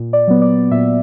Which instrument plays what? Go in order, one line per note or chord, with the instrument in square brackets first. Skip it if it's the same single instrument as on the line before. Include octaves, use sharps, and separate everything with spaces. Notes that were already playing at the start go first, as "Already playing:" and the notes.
Already playing: [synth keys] A#2
D5
F#3 B3
D5
A#2 E5